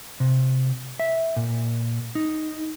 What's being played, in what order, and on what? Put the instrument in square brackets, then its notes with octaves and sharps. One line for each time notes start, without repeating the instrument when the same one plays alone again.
[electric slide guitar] C3
E5
A#2
D#4